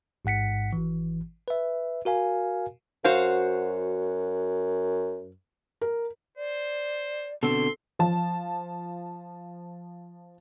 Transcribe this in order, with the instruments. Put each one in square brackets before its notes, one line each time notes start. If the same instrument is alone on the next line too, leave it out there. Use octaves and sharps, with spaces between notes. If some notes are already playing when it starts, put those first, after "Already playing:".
[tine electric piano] A1 G#2 F#5 B6 C#7
G#1 E3
B4 E5
F#4 A#4 F5 G#5
[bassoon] F#2 [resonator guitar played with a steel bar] F#4 C5 F5
[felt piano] A#4
[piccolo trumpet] C5 [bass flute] D5
[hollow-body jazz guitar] B2 D3 C4 [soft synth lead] A4 [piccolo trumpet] C6
[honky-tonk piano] F3 A5